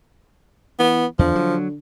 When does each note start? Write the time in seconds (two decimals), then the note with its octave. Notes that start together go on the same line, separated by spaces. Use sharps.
0.79 E3 B3
1.19 E2 D3 F3
1.35 F#3